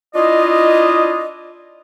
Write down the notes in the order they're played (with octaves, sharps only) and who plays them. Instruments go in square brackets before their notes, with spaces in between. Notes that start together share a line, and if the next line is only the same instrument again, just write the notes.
[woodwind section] D4 E4 F4 D#5